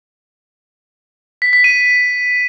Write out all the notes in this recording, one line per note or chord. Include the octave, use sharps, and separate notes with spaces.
B6
B6
D#7